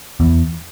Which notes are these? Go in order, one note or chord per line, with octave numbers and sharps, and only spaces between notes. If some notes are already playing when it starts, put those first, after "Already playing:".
E2